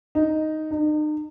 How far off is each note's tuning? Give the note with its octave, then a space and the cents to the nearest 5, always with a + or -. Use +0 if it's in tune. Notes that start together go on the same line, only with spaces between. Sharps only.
D#4 +0
D#4 -40